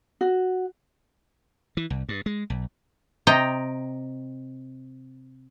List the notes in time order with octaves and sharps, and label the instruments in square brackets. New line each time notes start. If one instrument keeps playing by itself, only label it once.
[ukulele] F#4
[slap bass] E3
C2
G2
G#3
B1
[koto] C3 D#5 G5 A#5